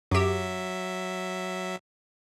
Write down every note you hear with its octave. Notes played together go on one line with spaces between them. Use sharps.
F#2 F#3 G4 E5